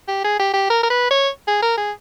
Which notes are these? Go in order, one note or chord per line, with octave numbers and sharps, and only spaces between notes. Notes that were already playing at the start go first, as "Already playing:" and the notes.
G4
G#4
G4
G4
A#4
A#4
B4
C#5
G#4
A#4
G#4